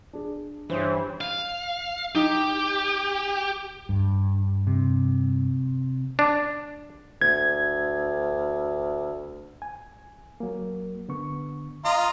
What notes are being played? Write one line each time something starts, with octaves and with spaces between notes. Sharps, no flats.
D4 G#4
G2 E3 C#4 E4 G4 C5 D#6
F5
D#4 G4
G2
C3
D4
D2 G#6
G#5
F#3 A#3
D3 B3 C#6
F4 D#5 A#5 C6